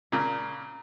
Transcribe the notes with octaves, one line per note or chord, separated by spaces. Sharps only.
A#2 C#3 A#5